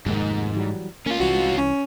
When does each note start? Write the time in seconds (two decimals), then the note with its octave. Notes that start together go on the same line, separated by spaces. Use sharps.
0.06 F1 D#2 G#2 D#3
0.56 E3 F#3 G3
1.06 A#3 C#4 F4
1.20 C2 E3 F#4
1.57 C#4